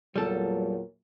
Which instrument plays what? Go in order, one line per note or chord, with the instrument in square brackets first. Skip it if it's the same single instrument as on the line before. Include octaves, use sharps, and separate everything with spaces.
[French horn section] E2 A#2 F#3 [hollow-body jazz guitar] G3 A4